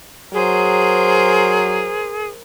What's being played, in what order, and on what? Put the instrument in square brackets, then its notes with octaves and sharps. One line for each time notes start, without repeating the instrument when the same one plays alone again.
[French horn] F#3 [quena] G#4 [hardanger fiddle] A#4 C5